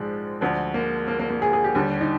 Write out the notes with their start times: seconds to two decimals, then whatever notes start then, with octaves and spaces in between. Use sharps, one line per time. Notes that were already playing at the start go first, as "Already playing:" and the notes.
Already playing: A#1 G#2 F3 G#3
0.41 D2 D3 F3
0.74 A#3
1.08 A#3
1.19 A#3
1.30 A#3
1.42 G#4
1.53 G#4
1.64 G4
1.75 D#2 D3 G3
2.01 D#4